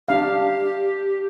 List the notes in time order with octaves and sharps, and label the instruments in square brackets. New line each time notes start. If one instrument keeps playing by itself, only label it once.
[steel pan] D4 F5 [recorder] G4